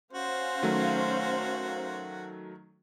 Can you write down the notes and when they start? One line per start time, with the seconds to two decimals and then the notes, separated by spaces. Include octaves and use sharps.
0.13 C#4 F#4 C5 F5
0.62 D#3 F#3 A3